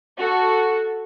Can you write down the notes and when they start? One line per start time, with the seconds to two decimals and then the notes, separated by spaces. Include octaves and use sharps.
0.19 F#4 A4